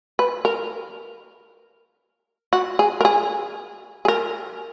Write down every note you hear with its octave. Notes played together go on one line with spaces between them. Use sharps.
B4
A#4
F#4
G#4
A#4
G#4
G#4
A#4